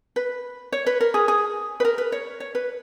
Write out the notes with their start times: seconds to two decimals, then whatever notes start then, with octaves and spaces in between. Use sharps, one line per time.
0.16 B4
0.72 C#5
0.86 B4
1.00 A#4
1.14 G#4
1.28 G#4
1.80 B4
1.85 A#4
1.98 B4
2.12 C#5
2.40 C#5
2.55 B4